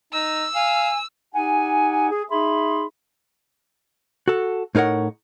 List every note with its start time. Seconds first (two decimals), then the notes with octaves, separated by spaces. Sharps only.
0.13 D#4 E6
0.55 F5 G#5
1.34 D#4 G4 F#5 G#5
2.11 G#4
2.30 D#4 G#4 E5 B5 C6
4.28 F#4 A4
4.75 A2 D#4 A#4 C#5 F#5